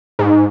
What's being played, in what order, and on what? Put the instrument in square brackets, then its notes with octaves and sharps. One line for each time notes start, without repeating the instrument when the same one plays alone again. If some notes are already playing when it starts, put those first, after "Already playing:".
[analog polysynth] G#2